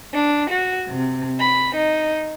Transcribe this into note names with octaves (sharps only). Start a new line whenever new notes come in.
D4
F#4
C3
B5
D#4